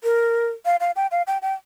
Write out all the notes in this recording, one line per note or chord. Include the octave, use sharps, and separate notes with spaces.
A#4
F5
F5
G5
F5
G5
G5